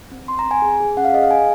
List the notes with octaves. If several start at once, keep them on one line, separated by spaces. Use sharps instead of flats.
C4
C4 C6
A#5
C4
G#5
G#4
G#4
C#4 F#5
F5
G#4 D#5
F5
G#4 G#5